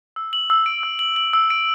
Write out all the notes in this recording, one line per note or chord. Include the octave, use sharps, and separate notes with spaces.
E6
F#7
E6
D7
E6
F#7
F#7
E6
D7